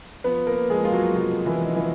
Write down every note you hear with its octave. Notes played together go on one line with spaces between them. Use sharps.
F3 B3 B4
A#3 A#4
F2 G#3 G#4
F4
F#3 F#4
C3 F3 F4
E3 E4
F2 D#4
E3 E4